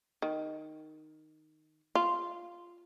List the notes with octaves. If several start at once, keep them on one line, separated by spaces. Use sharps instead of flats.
D#3
F4